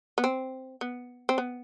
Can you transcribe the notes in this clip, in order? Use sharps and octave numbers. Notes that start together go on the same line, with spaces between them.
B3
C4
B3
C4
B3